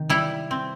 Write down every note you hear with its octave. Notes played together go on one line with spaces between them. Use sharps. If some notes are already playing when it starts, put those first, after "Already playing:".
Already playing: C3 D#3
G3 E4
C4